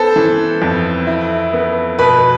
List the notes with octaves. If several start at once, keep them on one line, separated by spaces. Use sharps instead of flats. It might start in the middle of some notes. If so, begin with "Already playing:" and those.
Already playing: B3 A4 C5
E3
F2
E4
B3
B2 B4